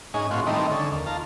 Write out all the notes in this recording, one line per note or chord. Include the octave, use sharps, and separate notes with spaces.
G#2 C#4 D#4 G#5
A2 C4 C#4 F4 F#4
D#3 E3 G3 A3 C4 D#4
D3 C#4 A4
D#2
F4 A5 A#5